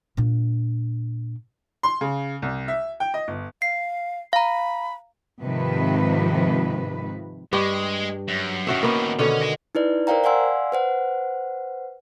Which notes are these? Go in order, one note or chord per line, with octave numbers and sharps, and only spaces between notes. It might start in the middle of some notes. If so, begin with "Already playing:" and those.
A#2 D4
C6
C#3
C2
E5
G5
D#5
G1
F5 C7
F5 A#5 B5
G#2 C3 D#3 F3 B4
G2 G#3 G4
F#2
A2 D#3 C#4 F#4 E5
A#3 B3 C#4
B2 D3 D#3 C#4
D#5 G#5
D#4 E4 B4 D5
A#4 C5 D5 F5 G5 A#5
D5 F5 F#5 G#5 C6 E6
B4 C5 F#5